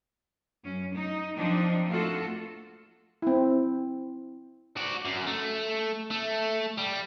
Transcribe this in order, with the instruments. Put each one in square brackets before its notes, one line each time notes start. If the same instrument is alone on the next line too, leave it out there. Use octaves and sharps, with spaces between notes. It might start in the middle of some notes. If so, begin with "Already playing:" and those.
[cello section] F#2 C#4
D#4
F3 C4 D4 D#4
A3 A#3 F4 F#4 A4
[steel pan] C4 E4
[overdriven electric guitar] F#4 D5
F#2
A3
A3
G3